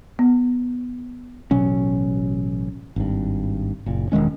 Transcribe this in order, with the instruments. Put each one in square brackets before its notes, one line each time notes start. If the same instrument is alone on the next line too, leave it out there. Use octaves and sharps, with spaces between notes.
[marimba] B3
[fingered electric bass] A1 B2 F#3 C#4
G#1 G2
F#1 A#2
E1 D#3 G#3 C#4